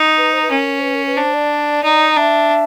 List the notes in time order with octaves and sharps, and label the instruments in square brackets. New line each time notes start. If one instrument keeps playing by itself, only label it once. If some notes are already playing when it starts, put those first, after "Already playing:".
Already playing: [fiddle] D#4
[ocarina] B4
C5
B4
[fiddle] C#4 [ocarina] A#4
[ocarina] C5
B4
A#4
B4
[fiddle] D4 [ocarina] C5
[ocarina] D5
[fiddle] D#4
[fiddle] D4 [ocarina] E5